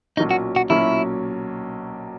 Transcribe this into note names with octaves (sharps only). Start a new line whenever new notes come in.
B1 A#2 F#3 A#3 C#4 D#4
F#4
F#4
B1 A#2 F#3 A#3 C#4 E4